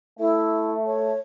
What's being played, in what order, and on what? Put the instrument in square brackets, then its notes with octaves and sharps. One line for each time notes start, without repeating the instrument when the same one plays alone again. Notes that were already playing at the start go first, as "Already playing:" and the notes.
[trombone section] A3 [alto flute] E4
[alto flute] C#5